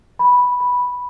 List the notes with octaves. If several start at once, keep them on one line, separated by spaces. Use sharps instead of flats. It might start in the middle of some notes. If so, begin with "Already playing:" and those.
B5
B5